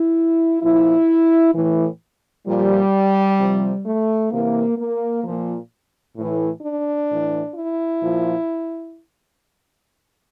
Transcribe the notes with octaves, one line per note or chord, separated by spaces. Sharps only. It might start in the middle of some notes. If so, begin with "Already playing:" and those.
Already playing: E4
A#2 F3 E4
A2 E3
A#2 F3 G3
C3 F3
A3
C3 E3 A#3
A#3
A#2 F3
A2 E3
D4
A2 E3
E4
A#2 F3